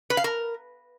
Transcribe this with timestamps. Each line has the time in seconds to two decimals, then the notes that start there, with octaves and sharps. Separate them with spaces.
0.10 B4
0.17 F5
0.24 A#4